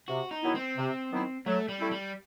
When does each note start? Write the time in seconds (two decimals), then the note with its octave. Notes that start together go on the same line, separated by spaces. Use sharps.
0.08 C3 F#4
0.31 D#4
0.43 D#3 F#3 B3 E4
0.55 C4
0.77 C3
1.11 D#3 F#3 B3 E4
1.46 F#3 A3
1.68 G3
1.80 A3 C4 E4
1.91 G3